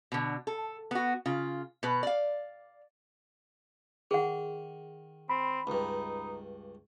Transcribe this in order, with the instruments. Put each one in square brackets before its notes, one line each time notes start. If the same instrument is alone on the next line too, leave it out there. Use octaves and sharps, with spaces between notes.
[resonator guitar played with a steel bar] B2 D3
A4
B3 F#4
C#3 F4
B2 B4
D5 F5
[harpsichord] D#3 [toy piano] G#4 F#5
[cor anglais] C4 [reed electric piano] B5
[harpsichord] C#2 G2 [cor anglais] D#4